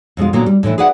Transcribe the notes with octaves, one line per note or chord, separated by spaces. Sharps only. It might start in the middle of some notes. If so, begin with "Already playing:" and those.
F2 B2 G#3 F4
A#2 D3 F#3 A#3 B3 F4
G3
A2 D3 E3 E4
G#4 B4 D5 E5 F#5